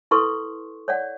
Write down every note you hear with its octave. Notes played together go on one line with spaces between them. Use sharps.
E4 A4 B4 C6 C#6
C#5 D5 F#5